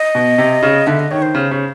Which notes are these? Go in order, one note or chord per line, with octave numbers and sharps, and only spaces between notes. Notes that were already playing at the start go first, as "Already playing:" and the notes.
Already playing: D#5
B2
C3
C#3
D3 E5
D#5
D#3 C#5
C5
C#3
C#3